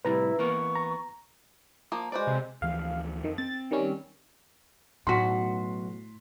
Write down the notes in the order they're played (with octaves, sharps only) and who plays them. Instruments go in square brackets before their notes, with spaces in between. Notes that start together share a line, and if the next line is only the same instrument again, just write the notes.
[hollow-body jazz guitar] A2 C3 G3 [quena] E4 [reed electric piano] B4 A#5
[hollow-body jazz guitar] E3 A#3 B3 [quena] C#6
[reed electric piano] A#5
[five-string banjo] F3 A#3
[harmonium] G#3 C5 [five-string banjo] F#4 B4 D5
[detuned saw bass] C3
[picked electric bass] D2 E3 F3 [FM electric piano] F5
[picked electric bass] F2 [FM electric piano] D#3
[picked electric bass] C4 [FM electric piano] A6
[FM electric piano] D#3 G3 C#4
[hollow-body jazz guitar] B1 F#4 [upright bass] A2 [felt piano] C6 B6